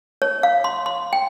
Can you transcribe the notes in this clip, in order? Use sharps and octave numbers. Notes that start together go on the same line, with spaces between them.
C#5
F5
C6
C6
G5